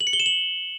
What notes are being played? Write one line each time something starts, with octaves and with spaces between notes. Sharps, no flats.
F#7
C#7
G7
E7
F#7